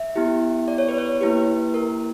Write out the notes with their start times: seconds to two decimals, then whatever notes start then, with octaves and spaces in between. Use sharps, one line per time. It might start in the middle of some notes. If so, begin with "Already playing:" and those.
Already playing: E5
0.16 B3 E4 G4
0.68 D5
0.78 C#5
0.88 B4
0.98 C#5
1.21 A#3 E4 G4 B4
1.74 A#4